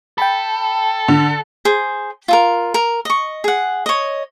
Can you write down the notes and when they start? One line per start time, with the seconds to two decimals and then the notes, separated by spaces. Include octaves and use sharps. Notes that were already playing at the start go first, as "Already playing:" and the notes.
0.18 A4 G5 A5 B5
1.08 D3
1.65 G#4 C5
2.28 F4 A4 A#4
2.74 A#4
3.05 D#5 C#6
3.44 G#4 F#5
3.86 C#5 D#5